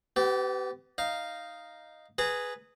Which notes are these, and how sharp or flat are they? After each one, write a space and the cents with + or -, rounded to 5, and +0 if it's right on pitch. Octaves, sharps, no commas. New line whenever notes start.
B3 +30 G4 -30
D#4 +0 F5 -5
G#4 +0 B4 +0 A#5 -30